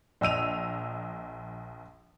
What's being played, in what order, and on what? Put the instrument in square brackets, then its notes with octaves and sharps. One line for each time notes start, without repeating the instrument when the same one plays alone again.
[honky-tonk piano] A#1 D#5 E6 D#7 F7